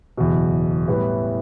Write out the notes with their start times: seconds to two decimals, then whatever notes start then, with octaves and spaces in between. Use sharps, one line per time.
0.17 F#1 E2 B2
0.88 A2 E3 G3 B3